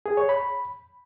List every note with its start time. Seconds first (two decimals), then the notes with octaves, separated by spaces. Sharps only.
0.06 G#4
0.17 C#5
0.29 B5